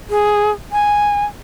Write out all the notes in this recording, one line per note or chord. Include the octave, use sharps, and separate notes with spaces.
G#4
G#5